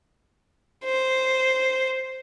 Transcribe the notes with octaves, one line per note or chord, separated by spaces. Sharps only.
C5